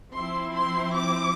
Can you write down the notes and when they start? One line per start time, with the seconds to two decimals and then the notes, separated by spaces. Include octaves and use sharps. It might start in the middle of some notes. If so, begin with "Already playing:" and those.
0.14 F3 C4 E4 C6
0.54 C6
0.95 D6